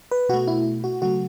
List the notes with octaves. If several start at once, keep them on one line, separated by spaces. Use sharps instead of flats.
B4
B2 A3 F#4
E4
F#4
C#3 F#3 A3 F#4